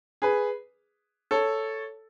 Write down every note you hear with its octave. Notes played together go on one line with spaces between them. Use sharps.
G#4 B4
A4 C#5